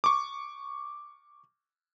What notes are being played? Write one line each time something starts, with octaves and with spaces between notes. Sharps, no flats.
C#6 D6